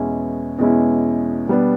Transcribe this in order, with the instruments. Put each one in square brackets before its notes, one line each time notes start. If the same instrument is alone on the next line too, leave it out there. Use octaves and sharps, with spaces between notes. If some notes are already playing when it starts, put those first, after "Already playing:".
Already playing: [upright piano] E2 B2 G#3 C#4 E4
E2 B2 G#3 C#4 E4
B2 G3 B3 D4